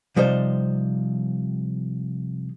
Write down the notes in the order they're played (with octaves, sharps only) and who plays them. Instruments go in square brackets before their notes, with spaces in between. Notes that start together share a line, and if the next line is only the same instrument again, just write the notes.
[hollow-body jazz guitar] C3 F3 G3 D#4 C5